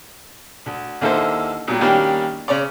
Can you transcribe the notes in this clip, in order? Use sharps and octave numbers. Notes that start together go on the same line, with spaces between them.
D2
D#2 D3 A#3 E4 A4 C5
A#2 F#3 G3
D#3 G3 A#3 C#4 D4 G4
C#3 C#5 D5